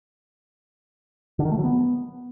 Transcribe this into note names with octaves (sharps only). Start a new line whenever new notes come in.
D3
D#3
A3
F#3
B3